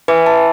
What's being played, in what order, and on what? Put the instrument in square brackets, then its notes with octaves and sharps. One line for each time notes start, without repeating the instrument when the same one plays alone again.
[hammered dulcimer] E3 [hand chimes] B4
[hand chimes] A5